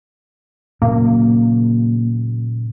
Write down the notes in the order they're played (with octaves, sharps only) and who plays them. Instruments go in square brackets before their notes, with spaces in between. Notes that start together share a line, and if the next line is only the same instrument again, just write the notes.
[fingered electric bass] A#2 C#3 F#3 [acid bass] A#3